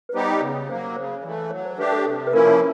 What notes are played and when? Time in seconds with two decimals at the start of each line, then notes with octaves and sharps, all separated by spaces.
0.09 B4
0.14 G3 B3 D#4 G4 C5
0.37 D5
0.41 C#3 C#5
0.69 F#3 A#3 C5
0.96 C#3 C5
1.23 E3 A3 D5
1.51 F#3 C#5
1.65 C5
1.78 A3 D4 G4 B4
1.92 A4
2.05 C3 A4
2.27 B4
2.33 F3 A#3 C#4 E4 A#4